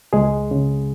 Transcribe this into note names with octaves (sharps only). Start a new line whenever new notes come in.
C#2 G#3 G#4
C#3